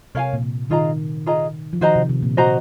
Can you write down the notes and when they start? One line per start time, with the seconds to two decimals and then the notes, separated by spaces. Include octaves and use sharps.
0.15 C3 A#4 C#5 F5 G#5
0.33 A#2
0.42 C3
0.70 D#3 F4 G#4 D#5 A#5
1.26 F4 G#4 D#5 A#5
1.73 F3
1.81 D#3 F#4 C5 D#5 A#5
1.95 C3
2.09 C3
2.23 A#2
2.37 F#4 C5 D#5 A#5